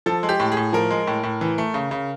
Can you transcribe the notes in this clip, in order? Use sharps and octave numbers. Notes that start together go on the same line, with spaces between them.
F3 A4
G#3
G4
A2
G#4
A2
F3 A#4
G#3
A2
A2
E3
A3
C#3
C#3